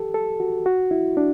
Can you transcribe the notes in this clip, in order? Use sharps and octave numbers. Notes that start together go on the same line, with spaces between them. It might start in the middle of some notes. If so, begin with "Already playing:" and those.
Already playing: G4 A4
A4
F#4
F#4
E4
D4